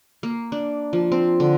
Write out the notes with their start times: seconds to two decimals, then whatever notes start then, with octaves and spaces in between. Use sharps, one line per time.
0.23 A#3
0.52 D4
0.93 F3
1.12 C4
1.40 D3